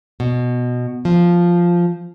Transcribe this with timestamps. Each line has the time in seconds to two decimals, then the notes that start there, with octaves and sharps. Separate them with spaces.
0.20 B2
1.05 F3